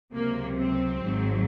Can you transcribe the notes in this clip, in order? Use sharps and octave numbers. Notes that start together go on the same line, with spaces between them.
C#2 C3 F#3 A#3
C4
G#1 G#2 F#3